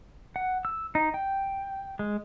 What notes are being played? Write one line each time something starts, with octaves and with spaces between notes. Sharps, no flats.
F#5
E6
D#4
G5
G#3